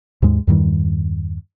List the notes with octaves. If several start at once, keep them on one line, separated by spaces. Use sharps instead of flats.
D#2 G#2 G#3
E2 G2 D#3 G3